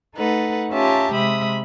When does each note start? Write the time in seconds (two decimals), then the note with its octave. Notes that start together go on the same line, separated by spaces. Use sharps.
0.15 A3 D#4 A4 B4 F#5
0.73 C#4 F4 G4 E5 A5 A#5
1.14 C3 G#3 E5 B5 D#6